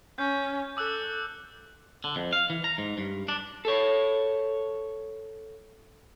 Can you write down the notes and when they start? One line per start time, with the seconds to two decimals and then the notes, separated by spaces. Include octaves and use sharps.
0.18 C#4 G6
0.77 A4 D6 E6 F#6
2.04 D3
2.16 F2
2.33 F5
2.50 E3
2.64 A#5
2.78 G#2
2.98 G2
3.28 D4
3.65 A4 C#5